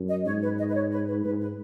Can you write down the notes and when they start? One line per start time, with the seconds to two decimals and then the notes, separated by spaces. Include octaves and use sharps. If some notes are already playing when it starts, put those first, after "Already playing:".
Already playing: F#2
0.09 D#5
0.25 G#2 C#5
0.42 B4
0.58 D#5
0.70 B4
0.74 C#5
0.92 B4
1.08 B4
1.24 G#2 B4
1.40 B4